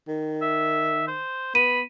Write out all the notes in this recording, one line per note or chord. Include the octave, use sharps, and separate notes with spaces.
D#3
E5
C5
B3 B5 D#7